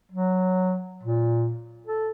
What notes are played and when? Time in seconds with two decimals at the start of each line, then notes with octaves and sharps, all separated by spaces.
0.11 F#3
1.03 A#2
1.86 A4